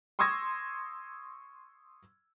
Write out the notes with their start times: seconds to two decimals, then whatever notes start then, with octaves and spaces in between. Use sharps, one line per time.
0.19 C6 C#6 D#6 E6 G#6 A#6